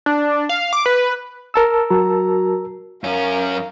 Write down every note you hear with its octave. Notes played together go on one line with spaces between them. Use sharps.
D4
F5
D6
B4
A#4 A5 E6
F#3 F#4 A#5
F#2 C#4 A#4 F5